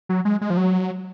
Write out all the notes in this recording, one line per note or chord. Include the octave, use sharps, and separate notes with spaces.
F#3
G#3
G#3
F3
F#3